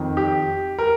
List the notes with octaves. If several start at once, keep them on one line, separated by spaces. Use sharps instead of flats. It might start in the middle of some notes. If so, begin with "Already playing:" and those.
Already playing: F2 D#3
G4
A#4